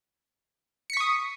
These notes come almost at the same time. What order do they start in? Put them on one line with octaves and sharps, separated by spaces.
C#7 B6 C#6 D#6